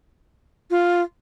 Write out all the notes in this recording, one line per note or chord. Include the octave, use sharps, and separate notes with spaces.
F4